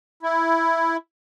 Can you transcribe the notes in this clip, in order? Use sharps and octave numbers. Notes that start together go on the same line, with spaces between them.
E4